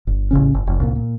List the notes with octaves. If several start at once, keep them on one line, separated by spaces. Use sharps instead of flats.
G1
A1 C#3 C#4
G1
F1
C2 A#2
A#2